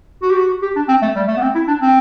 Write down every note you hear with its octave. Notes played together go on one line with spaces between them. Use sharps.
F#4
G4
F#4
G4
D4
C4
A3
G3
A3
B3
C4
E4
D4
C4